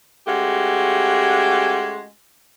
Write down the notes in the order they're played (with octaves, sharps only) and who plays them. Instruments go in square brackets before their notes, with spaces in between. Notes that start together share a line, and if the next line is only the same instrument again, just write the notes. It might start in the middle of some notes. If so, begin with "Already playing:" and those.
[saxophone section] G#3 A3 C#4 F#4 G4